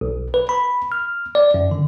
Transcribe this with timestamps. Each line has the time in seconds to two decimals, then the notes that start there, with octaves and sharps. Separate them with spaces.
0.01 B1
0.34 B4
0.49 B5
0.92 F6
1.35 D5
1.54 F#2
1.71 D3